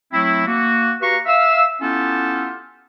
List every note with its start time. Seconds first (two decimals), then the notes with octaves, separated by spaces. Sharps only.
0.12 F#3 A3 C4 E4
0.46 A#3 F#4
1.01 F#4 G4 B4 F5 A#5 C#6
1.26 E5 F5 E6
1.81 B3 C#4 E4 F4 G4 A4